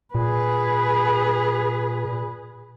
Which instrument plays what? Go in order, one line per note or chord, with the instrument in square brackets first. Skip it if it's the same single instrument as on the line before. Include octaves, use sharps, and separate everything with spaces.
[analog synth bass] A#2 [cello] G#4 B4